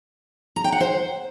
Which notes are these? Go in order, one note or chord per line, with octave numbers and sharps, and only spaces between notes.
A#5
G5
F#5
C5